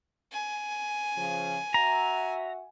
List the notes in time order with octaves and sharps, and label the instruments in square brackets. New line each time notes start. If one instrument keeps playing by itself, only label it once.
[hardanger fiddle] G#5
[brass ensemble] C#3 F3
[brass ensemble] F#4 E5 F#5 [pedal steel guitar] A#5